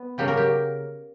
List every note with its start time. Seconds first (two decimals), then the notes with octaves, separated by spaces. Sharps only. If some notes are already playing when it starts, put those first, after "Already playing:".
Already playing: B3
0.18 C#3 F#3 A#3 G4
0.28 A#4
0.37 G4